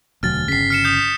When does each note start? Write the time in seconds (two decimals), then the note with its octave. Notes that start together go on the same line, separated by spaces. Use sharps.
0.23 E1 D2 F#3 F6 A6
0.48 G1 C#3 B6 C7
0.70 F6 C#7 E7
0.84 D#6 G6 B6